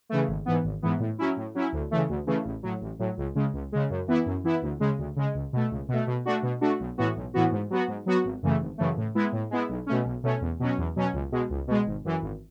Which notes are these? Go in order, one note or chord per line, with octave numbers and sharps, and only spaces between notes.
C#3 E3 A3
G#1
G#2 E3 B3
G#1
G#2 E3 B3
A2
F#3 C#4 E4
A2
F#3 C#4 E4
D2
C#3 E3 A3
D2
C#3 E3 A3
A1
A2 F#3
A1
A2 F#3
C#2
C#3 G#3
C#2
C#3 G#3
F#2
E3 B3 E4
F#2
E3 B3 E4
D2
C#3 G#3
D2
C#3 G#3
C#2
B2 A3
C#2
B2 A3
B2
A3 D4 F#4
B2
A3 D4 F#4
B1
A2 E3 B3 F#4
B1
A2 E3 B3 F#4
G#2
F#3 B3 F#4
G#2
F#3 B3 F#4
G#1
F#2 C#3 E3 A3
G#1
F#2 C#3 E3 A3
A2
G#3 B3 E4
A2
G#3 B3 E4
B1
B2 A3 C#4
B1
B2 A3 C#4
E2
B2 F#3 C#4
E2
B2 F#3 C#4
C#2
B2 G#3
C#2
B2 G#3
G#1
F#2 E3
G#1